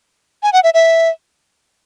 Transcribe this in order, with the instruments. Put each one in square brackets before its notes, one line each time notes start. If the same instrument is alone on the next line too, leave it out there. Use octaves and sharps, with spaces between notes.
[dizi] G#5
F#5
E5
E5